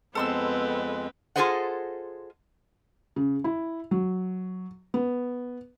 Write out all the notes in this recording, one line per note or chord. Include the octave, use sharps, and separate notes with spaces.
F2 G#3 B3 C4 A4 B4 C6 E6
F4 G#4 A4 C5 D#5 F#5
C#3
E4
F#3
B3